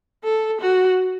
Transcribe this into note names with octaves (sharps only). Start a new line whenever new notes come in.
A4
F#4